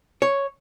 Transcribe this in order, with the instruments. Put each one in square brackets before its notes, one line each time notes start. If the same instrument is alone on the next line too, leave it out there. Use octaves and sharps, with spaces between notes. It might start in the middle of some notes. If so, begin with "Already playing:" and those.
[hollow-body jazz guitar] C#5